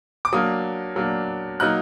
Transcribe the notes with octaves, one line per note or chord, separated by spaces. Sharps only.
D6
F#3 A#3 D4 D#6
F#3 A#3 D4
F#3 A#3 D#4 F#6